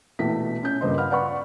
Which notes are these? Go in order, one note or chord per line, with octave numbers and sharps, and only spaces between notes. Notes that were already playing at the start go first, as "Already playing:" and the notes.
A#1 B2 E3 A3 B6
C#4 G6
G2 A#2 C#3 C5 D#5 C6
F5 F#5 B5 F6
B4 D5 F#5 B5 C#6